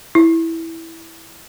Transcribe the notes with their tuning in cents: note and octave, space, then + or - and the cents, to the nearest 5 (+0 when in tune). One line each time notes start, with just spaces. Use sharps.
E4 -5